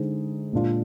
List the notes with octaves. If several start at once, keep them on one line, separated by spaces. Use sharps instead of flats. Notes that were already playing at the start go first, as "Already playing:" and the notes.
Already playing: D3 G#3 D#4 G#4 C5
A#2 G#3 D4 F4